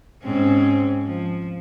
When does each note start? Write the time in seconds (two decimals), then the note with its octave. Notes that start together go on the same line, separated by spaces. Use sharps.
0.23 G#2 C4 C#4
1.05 F3